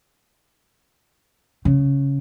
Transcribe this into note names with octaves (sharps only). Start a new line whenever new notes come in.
C#3